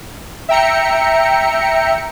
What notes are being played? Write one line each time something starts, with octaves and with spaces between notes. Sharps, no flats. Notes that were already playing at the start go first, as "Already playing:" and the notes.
E5 G5 A#5 C#7